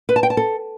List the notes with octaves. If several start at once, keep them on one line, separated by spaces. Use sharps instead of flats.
B4
A5
G5
A5
A4